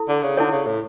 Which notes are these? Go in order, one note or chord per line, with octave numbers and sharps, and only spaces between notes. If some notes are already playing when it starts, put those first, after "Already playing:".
Already playing: E4 A4
D3
C#3
D3 E4 A4 C#5
C#3
A2